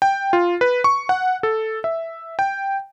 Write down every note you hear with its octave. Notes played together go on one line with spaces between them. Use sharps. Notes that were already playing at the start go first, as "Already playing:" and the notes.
G5
F4
B4
C#6
F#5
A4
E5
G5